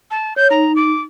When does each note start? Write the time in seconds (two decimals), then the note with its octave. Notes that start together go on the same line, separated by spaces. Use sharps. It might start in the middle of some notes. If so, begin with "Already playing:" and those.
0.11 A5
0.36 C#5 G6
0.50 D#4 A#5
0.76 D6